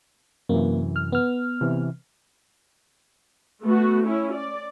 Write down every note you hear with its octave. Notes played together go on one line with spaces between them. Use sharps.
F#2 C3 E3 A#3
F6
B3 F6
C3 E3
A3 B3 F#4
C#4 E4
D5